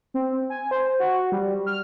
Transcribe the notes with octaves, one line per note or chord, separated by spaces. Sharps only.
C4
G#5
C5
F#4
G3
F6